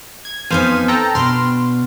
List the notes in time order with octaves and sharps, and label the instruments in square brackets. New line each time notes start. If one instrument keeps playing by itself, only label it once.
[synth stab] G#6
[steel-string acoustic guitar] F2 B3 D#4 [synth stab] C5 F5 G#5
[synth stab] A4 G5 A#5
[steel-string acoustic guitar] B2 D4 [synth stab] C6 F6